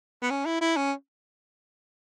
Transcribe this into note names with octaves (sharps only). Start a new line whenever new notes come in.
B3
C#4
E4
E4
C#4